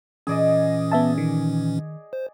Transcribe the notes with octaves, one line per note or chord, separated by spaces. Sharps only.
A#2 E3 C#4 G#4 D5 D#5
B3 E5 A5
D#3
C5